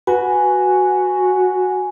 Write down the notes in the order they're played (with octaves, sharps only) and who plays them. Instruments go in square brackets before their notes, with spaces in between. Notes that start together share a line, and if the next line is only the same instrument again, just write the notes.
[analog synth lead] F#4 [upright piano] B4 [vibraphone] G#5